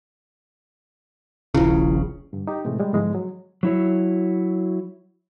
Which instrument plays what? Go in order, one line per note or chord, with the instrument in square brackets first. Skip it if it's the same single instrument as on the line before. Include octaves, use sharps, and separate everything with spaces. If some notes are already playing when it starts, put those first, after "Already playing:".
[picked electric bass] D#1 A#1 C#3 [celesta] E4 F4
[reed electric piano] G2 D3
D#4 G4
A2 C3 E3 G#3 A3
G3 G#3
G#2 D3 E3 F3 G#3 B3
F#3
[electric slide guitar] F#3 E4 C#5